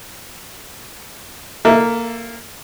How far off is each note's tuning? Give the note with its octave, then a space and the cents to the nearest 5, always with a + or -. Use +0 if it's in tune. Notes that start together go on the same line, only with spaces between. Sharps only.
A#3 -5 A4 +15 E5 +20